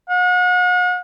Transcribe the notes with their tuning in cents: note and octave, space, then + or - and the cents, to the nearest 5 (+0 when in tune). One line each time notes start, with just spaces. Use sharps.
F#5 -40